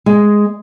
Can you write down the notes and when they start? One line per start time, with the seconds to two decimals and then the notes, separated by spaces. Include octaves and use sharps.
0.06 G#3